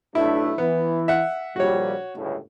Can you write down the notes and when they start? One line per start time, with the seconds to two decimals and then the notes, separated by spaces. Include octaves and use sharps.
0.15 B1 A3 D4 E4
0.58 E3 B3 E4
1.08 E5 F#5
1.56 A#1 D#2 G3 F#4 C#5
2.15 G1 C#2 A2